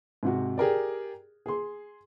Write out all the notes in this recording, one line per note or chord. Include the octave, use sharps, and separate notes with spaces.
G#2 C3 F#4
G4 G#4 A#4 D5
G#4 C6